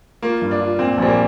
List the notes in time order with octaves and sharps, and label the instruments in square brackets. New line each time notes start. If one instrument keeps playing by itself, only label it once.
[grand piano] A#3 [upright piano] F4
[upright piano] G2
[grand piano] D4
[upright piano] F4
[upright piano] A#2 [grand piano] C4
[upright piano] A#1 [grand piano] G3
[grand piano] A#3